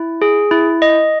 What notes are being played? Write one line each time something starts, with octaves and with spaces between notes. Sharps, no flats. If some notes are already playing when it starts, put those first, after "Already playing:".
Already playing: E4
G#4
E4
D#5